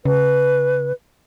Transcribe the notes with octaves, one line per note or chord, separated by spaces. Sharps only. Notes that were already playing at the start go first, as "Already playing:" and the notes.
C#3 B4